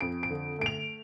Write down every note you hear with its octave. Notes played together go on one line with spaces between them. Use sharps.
F2 D7
D7
D3
A3 D7
F7